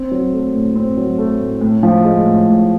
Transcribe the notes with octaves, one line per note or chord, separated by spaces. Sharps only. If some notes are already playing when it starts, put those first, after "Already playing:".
Already playing: C4
F#3
A3
A2
C4
F#3
A3
A2
A2
F3
G#3
A2
A2